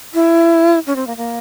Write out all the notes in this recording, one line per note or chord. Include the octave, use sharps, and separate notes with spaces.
E4
C#4
C4
A#3
A#3